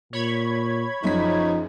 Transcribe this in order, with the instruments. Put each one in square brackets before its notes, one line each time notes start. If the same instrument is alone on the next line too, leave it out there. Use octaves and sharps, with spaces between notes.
[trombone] A#2 [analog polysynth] C#5 B5 G#6
[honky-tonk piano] F#1 F#2 B6 [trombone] F3 [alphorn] D#4